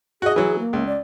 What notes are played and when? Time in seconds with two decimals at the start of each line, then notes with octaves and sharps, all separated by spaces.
0.22 F#4 G#4 D#5
0.36 E3 F#3
0.59 A#3
0.73 C#2
0.87 D5